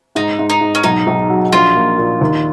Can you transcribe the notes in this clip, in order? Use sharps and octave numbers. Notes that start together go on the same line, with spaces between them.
G#2 D#4
G#2
D#4
G#2
C#4
B1 D#4
B1
F#3
A#1 F4
A#3
A#2
D#2